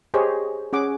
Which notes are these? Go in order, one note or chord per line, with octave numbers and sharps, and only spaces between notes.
G4 G#4 C5 C#5 D#5
C#4 G#4 F#5 D6